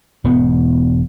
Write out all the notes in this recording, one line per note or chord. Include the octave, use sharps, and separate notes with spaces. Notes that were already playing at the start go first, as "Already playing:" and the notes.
E1 E2 G#2 B3